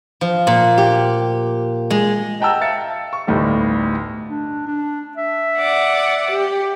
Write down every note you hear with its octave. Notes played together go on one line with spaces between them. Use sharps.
F3
A#2
G4
G#3
D#5 F#5 G5 A5 A#5 E6
E5 F5 A6 C#7
C#6
G1 D2 A2 G3 D#4 A4
D4
D4
E5
D5 F#5 D6
G4